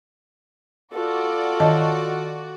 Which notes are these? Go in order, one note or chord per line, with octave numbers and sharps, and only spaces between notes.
F4 F#4 A4 D5
D#3 D#5 A5